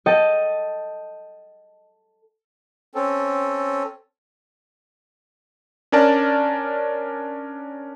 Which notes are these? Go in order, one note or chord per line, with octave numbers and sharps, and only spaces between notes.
A4 D#5 G5 A5
C4 C#4 A4
C#4 D4 A#4 D5 A5